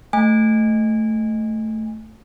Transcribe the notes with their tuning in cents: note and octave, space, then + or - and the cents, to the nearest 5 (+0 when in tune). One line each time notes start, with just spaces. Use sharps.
A3 +0 G#5 -20